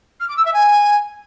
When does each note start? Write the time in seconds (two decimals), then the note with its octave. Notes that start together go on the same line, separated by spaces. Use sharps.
0.20 F6
0.28 D6
0.36 E6
0.45 E5
0.53 G#5